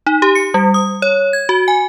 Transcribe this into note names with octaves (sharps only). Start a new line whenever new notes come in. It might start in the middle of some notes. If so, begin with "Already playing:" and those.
D#4
G4
C#7
G3
D#6
C#5
G#6
F#4
G#5